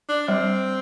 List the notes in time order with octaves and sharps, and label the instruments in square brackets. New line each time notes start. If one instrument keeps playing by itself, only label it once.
[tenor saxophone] D4
[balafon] G3 [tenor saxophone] C4